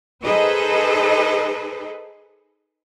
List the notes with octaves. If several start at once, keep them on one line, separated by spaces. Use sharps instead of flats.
D#4 G#4 A4 B4 C5 D#5